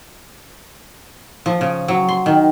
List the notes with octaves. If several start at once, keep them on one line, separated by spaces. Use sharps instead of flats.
F3
C#3
F#3
C6
D#3